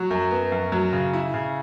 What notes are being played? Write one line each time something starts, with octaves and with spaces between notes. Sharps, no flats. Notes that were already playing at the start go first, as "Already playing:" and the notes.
Already playing: F#3
F#2
B3
F#2
F#3
C#3
E4
C#3